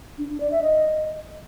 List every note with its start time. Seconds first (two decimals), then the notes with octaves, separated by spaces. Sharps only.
0.18 D4
0.29 D4
0.40 D5
0.51 E5
0.62 D#5